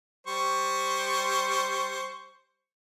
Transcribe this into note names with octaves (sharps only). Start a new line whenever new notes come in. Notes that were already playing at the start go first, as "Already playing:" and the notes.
G3 C5 C#6